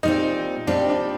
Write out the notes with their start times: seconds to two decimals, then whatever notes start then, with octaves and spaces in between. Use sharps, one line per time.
0.03 A#2 G3 C4 D#4
0.67 A#2 G3 C4 D4
0.90 D4